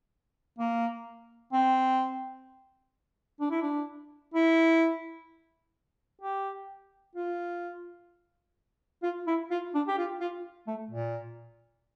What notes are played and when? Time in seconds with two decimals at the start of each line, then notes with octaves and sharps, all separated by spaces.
0.59 A#3
1.53 C4
3.40 D4
3.51 E4
3.62 D4
4.34 E4
6.22 G4
7.15 F4
9.03 F4
9.27 E4
9.51 F4
9.74 D4
9.88 G4
9.98 F4
10.20 F4
10.67 A3
10.91 A#2